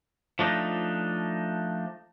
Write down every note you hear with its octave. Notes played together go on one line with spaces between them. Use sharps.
F3 A3 D4 D#4